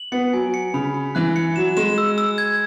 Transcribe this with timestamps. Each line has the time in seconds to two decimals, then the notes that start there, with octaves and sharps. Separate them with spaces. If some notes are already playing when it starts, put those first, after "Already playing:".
Already playing: F#7
0.12 B3 C#7
0.33 F#3 G#5
0.54 C#7
0.74 C#3 B5
0.94 C#7
1.15 E3 F#6
1.36 C#7
1.56 F#3 E7
1.77 G#3 E7
1.98 E6
2.18 E6
2.38 G#6